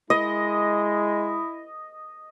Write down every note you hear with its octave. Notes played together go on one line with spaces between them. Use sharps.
G#3 E4 D#5